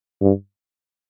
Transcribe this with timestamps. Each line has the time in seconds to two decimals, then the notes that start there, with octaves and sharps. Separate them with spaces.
0.21 G2